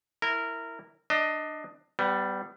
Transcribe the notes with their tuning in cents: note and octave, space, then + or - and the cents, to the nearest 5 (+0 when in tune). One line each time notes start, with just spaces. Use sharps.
E4 +0 A#4 -15
D4 +25 D#5 +15
G3 -5 B3 +30